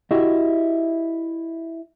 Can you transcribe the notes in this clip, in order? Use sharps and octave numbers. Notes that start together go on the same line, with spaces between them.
E4 F#4 G4 D#5 E5